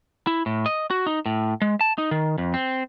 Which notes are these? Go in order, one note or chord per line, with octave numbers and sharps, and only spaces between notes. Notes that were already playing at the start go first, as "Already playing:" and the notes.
E4
A2
D#5
F#4
D#4
A2
G#3
A5
D#4
D#3
F2
C4